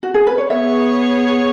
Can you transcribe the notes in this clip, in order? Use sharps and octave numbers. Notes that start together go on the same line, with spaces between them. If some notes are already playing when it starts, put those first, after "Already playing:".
F#4
G#4
B4
C#5
B3 G#4 C#5 E5